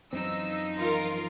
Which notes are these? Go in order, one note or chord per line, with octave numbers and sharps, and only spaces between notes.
F#2 E3 F3 C4 D#4 E6
F4 A#4